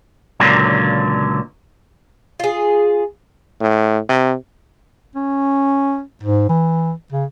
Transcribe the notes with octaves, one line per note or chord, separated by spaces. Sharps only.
C#2 A#2 D3 F#3
F4 G#4
A2
C3
C#4
G#2
E3
C#3